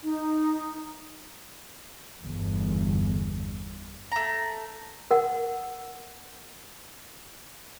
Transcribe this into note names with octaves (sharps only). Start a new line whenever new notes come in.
D#4
G1 E2
A3 A#5
A#4 F#5